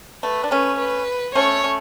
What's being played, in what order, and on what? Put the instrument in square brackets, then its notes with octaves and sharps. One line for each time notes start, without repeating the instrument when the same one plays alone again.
[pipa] A3 [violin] B4
[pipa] D4
[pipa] A3 C#4 [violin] B4
[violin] B4
[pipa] A3 C#4 [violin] C#5
[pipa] A3 C#4